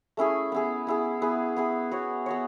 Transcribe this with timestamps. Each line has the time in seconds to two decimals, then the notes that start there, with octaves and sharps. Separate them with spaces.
0.17 A3 C#4 E4 G#4
0.52 B3 E4 G#4
0.87 B3 E4 G#4
1.22 B3 E4 G#4
1.56 B3 E4 G#4
1.91 B3 F#4 C#5
2.26 B3 F#4 C#5